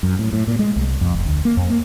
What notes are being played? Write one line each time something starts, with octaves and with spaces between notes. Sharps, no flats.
F#2
A2
A2
A#2
G#3
C2
F2
F1
D2
A#3
F2
A#3